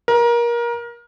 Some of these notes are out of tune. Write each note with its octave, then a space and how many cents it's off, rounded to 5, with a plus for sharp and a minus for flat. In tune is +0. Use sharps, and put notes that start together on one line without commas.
A#4 +25